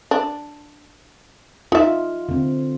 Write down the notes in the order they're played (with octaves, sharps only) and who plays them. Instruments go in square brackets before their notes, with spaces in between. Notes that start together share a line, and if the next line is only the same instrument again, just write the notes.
[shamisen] D4
[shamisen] D#4 E5 [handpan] F4
[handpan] D3 C4